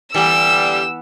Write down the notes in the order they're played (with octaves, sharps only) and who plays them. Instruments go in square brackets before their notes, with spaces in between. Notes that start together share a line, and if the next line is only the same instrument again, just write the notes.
[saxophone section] D3 G3 [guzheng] E3 B3 [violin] E6